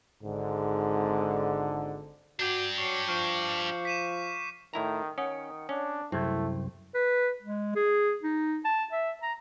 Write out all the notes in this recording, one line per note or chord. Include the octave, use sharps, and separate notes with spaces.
G#1 G#2 D3
D4 F#4 G4 D6 G6 C7
F#3 C#6 C7 C#7
F3 C#6 F6 G6
B6 D#7 E7
A2 D#3 E4 A#5
D#3 C#4 F#5 D#6 C#7
C#4 D4
C2 F#2 A3 C4 E4
B4
G#3
G#4
D#4
A5
E5
A#5